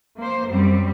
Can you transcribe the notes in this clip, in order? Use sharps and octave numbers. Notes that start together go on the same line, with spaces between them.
A#3 C5
F#2 G3 C4